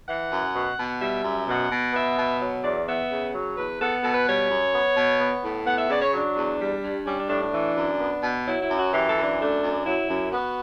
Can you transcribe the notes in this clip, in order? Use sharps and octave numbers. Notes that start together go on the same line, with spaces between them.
E3 F#5
F#2
B2
B2
G3 E5
F#2
B2 F#5
B2
B3 E5
B2
F#3
E2 D5
B3 E5
C#3
F#3
E2 B4
B3 A4
B2 A4
B4
G3 C#5
F#2
B3
B2
B3
A2
B3 F#5
E5
C#3 D5
C#5
F#3 D4
E2
G3
G2
G3 C#4
D4
A2 D4
D4
E3
F#2
B3
B2
F#3 E4
E4
F#2
F#4
E3 G4
A4
F#2
D4
A3 D4
F#2
F#3 E4
F#2
B3 F#4